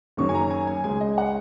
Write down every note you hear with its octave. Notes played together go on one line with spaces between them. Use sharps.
F#1 F#2 D#3 F#3 C#6
G#5
A#5
G#5
G#5
C#2 C#3 G#3 G#5
D#5
F#5